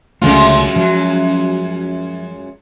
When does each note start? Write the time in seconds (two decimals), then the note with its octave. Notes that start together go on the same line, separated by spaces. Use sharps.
0.22 C#2 F#2 D3 G#3 A3 F4
0.76 F3 F#3